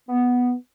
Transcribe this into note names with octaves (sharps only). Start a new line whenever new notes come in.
B3